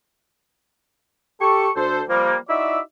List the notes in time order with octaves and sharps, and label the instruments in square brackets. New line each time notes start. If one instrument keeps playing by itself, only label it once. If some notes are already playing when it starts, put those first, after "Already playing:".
[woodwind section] G4 A4 C#6
D2 A4 C5
F3 G3 A#3
D#4 E4 F#4 D5 E5